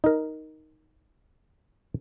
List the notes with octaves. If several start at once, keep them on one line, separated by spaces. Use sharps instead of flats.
D#4 A#4